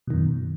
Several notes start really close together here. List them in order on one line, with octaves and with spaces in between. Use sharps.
B2 D#3 F#2